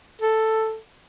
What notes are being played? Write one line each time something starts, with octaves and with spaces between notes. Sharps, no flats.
A4